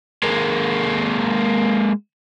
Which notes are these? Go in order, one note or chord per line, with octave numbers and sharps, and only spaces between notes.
G#3 A#3